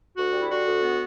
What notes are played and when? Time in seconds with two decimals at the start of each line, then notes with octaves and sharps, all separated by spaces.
0.17 D2 F#4
0.33 G3
0.40 E4
0.50 D3 F#4
0.67 D2
0.82 B3